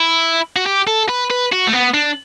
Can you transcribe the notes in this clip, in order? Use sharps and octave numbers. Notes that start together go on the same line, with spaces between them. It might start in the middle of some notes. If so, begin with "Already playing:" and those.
Already playing: E4
F#4
G4
A4
B4
B4
F#4
A3
B3
D4